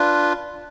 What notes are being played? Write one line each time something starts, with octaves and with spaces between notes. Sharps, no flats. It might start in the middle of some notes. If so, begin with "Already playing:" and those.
Already playing: D4 F4 B4